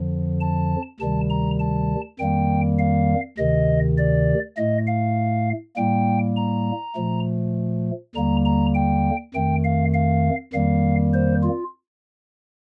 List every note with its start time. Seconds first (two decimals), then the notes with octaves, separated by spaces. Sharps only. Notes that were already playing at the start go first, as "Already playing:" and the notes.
Already playing: F2 D3 F3
0.40 A5
1.00 D2 C3 D#3 G3 A5
1.30 A#5
1.60 A5
2.19 F2 D#3 G3 A#3 G5
2.79 F5
3.38 D2 C3 D#3 D#5
3.98 D5
4.57 A2 A3 D#5
4.87 F5
5.76 A2 G3 A#3 G5
6.36 A#5
6.96 A#2 F3 A3
8.15 D#2 D3 G3 A#3 A#5
8.45 A#5
8.74 G5
9.34 F2 D#3 A3 G5
9.64 F5
9.94 F5
10.53 F2 D#3 G3 A#3 F5
11.13 C5
11.43 F4